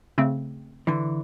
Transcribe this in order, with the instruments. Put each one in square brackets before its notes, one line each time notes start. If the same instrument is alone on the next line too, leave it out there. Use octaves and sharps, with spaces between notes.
[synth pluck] C#3 A3 C4
[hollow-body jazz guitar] D3 E3